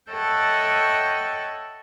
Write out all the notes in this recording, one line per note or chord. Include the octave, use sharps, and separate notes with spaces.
A4 C#5 D#5 E5 F#5 G5